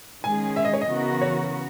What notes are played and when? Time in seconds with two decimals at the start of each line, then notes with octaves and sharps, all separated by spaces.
0.24 D#3 G#3 C#4 G#4 G#5
0.56 E5
0.65 D#5
0.73 C#5
0.81 D#5
0.89 C#3 E3 B3 F#4 A#4
1.21 C#5